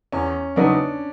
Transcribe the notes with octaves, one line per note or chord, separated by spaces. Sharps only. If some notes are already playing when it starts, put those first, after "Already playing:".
E2 C#4
C#3 F#3 B3 D4 D#4